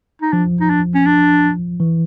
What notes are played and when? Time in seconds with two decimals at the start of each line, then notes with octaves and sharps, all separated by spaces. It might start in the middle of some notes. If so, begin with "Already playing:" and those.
0.22 D#4
0.33 F3 D4
0.61 D#4
0.70 D4
0.95 C#4
1.07 D4
1.80 E3